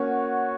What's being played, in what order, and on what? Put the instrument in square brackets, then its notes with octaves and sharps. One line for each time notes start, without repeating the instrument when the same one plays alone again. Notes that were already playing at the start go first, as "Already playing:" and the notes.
Already playing: [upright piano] A#3 C#4 [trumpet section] F#4 C#5 F#5